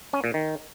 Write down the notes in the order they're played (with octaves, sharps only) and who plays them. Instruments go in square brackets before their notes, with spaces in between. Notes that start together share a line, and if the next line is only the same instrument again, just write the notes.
[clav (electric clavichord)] C#4
A#2
D#3